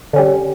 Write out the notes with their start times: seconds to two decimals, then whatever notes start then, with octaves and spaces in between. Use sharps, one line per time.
0.13 D3
0.16 C#4
0.19 G3